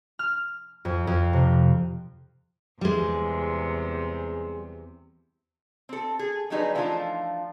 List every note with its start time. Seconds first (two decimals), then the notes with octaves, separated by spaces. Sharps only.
0.19 F6
0.85 F2
1.07 F2
1.33 C3
2.81 E2 C3 G3 G#3
5.89 C4 A4
6.19 G#4
6.50 D3 F#3 G3 D#4 G#4 B4
6.75 E3 F3 A3 D4 D#4 F4